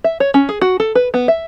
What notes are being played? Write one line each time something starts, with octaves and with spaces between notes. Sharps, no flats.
E5
C#5
C#4
G#4
F#4
A4
B4
B3
E5